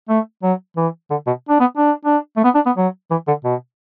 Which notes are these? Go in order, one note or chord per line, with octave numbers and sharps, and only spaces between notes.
A3
F#3
E3
D3
B2
D4
B3
D4
D4
A3
B3
D4
B3
F#3
E3
D3
B2